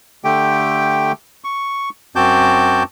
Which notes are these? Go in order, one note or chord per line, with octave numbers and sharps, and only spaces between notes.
D3 A3 G4 G5
C#6
F#2 C4 F#4 A5 D6 G6